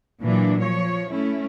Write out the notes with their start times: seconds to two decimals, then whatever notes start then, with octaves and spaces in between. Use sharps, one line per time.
0.22 A#2 E3 F#3 D4
0.60 F3 C#5
1.11 A3 C#4 E4